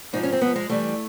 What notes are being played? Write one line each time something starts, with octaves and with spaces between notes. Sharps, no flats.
G#2 F3 D#4
C#4
C4
G#2 F3 B3
G#3
G2 E3 G3 A3